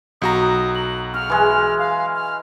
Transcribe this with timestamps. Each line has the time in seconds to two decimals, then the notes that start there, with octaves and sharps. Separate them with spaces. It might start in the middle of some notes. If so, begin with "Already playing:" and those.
0.22 B1 F#4 A#5 D#6
0.75 F#7
1.14 C#6 F6
1.30 E3 G#3
1.79 F5
2.15 F6